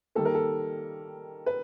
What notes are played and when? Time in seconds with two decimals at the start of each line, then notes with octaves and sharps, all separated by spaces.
0.15 D#3 G3 A#3 A4
0.25 A#4
0.35 A4
1.46 B4